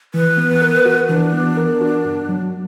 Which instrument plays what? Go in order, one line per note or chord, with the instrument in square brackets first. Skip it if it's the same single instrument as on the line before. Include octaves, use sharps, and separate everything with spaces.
[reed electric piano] E3 [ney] B4
[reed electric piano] B3
A#4
F#4
[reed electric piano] E3 [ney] D4
[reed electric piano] B3
A#4
F#4
G2
F#3